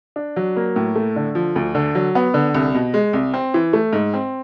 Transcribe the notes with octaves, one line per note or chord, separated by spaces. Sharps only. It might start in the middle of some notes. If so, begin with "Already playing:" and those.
D4
F#3
A#3
A2
A3
D3
F3
D2
D3
F#3
B3
D3
C2
B2
G#3
C2
C4
E3
A3
G#2
C4